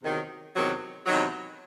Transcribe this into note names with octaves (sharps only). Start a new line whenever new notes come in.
E2 C3 D#3 F#3
E2 C3 D#3 F#3
E2 C3 D#3 F#3